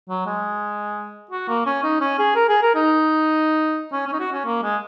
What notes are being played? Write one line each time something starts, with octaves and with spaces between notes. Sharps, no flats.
F#3
G#3
F#4
A#3
C#4
D#4
C#4
G#4
A#4
G#4
A#4
D#4
C#4
C#4
D#4
F#4
C#4
A#3
G#3